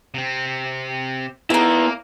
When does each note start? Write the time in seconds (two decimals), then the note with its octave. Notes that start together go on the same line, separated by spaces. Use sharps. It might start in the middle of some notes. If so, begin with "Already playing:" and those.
0.14 C3 C4
1.50 A#3 B3 D#4 E4 A4